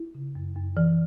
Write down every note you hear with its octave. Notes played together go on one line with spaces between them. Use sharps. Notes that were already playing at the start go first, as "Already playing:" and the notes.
Already playing: E4
C#3
F#2
F#2
E3